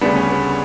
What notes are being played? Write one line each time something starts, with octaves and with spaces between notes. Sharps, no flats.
D2 C#3 G3 B3 D4
C#4
B3